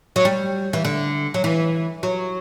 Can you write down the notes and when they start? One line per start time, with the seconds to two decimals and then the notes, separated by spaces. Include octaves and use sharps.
0.16 F#3
0.25 G3
0.73 E3
0.85 D3
1.34 F#3
1.44 E3
2.03 F#3